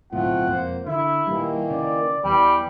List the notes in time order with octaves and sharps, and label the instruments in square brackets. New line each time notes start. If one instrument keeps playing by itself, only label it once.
[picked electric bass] D1 B1 A2 [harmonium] A3 C4 F4 [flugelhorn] F#5
[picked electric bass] E1 F2 [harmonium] A#3 C5
[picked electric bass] D3 [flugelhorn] E4 [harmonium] E5
[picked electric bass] A#2 G3 [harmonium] D#3 E3 A#3
[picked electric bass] C#3 [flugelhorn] D5
[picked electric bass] E2 [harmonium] E3 [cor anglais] G3 [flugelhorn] G5